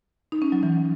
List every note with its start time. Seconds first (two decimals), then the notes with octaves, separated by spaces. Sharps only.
0.32 D#4
0.42 C#4
0.52 F#3
0.63 E3